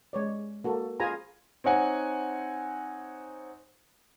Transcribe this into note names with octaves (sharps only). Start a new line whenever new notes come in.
G#3 C#5 D5
A#3 F#4 A4
F4 G#4 C5 G#5 A#5 B5
C4 D#4 C#5 F#5 G#5